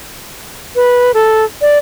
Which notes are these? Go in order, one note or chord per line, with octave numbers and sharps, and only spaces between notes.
B4
A4
D5